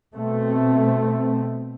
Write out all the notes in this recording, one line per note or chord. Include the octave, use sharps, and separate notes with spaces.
B2 A3 C4